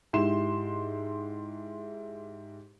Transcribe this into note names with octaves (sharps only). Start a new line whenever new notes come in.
G#2 E4 G4 C6 E7